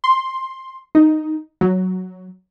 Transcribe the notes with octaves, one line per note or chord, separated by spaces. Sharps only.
C6
D#4
F#3